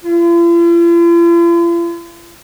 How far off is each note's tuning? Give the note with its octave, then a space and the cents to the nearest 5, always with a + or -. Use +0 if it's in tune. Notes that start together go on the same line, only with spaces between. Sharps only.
F4 -45